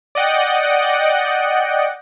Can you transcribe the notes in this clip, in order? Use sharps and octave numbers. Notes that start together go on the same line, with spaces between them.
D5 D#5 F#5 G5